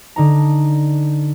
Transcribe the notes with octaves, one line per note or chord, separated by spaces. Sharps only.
D3 D#4 A#5